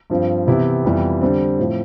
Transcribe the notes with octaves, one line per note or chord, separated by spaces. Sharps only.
G2 F3 C4 F4
C3 E3 B3 E4 G4
F2 E3 G3 B3
D3 G3 C4
A2 F3 C4